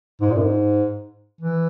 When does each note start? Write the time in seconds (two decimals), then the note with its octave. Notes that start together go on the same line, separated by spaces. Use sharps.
0.21 G#2
0.31 A#2
0.37 F#2
0.42 G#2
1.41 E3